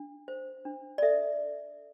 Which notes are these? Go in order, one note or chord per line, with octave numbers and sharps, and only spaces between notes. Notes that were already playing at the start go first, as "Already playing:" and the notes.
Already playing: D4
C5
D4
D5
A4 E5